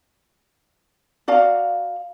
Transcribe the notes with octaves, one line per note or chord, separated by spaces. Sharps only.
F#4 D5 F5 A#5